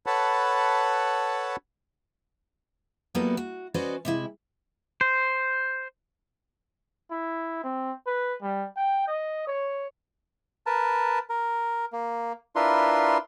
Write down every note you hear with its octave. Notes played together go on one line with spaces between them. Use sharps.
A4 B4 C#5 F#5 A5 B5
F#3 G3 A#3 B3 E4 A4
F#4
C#4 F#4 B4 C5 D5 D#5
C3 G#3 E4
C5
E4
C4
B4
G3
G5
D#5
C#5
A#4 B4 A5
A#4
A#3
D4 E4 F4 A#4 B4 C6